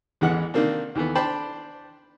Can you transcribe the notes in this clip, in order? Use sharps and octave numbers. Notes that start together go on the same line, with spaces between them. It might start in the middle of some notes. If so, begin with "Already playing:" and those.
A1 E2 E3 G#3 B3 F#5
C3 D#3 A#3 C4 D4
D#2 E3 A3 B3
D4 C5 D5 G5 A5 B5